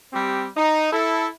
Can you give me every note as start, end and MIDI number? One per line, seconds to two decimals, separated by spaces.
0.13 0.48 55
0.13 0.48 60
0.13 0.48 67
0.57 0.93 63
0.93 1.27 64
0.93 1.27 69